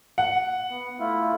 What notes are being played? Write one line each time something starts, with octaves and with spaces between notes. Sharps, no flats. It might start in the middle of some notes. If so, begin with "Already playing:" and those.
F#5
B3
A3 E4 F4